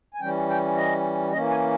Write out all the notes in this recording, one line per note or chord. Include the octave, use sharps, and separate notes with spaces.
G#5
E3 G3 C#4 G5
G5
D#5
E3 A#3 C#4 D#5
G#5